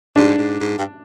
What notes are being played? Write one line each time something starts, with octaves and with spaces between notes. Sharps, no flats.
G#2 D4
G#2
G#2
G2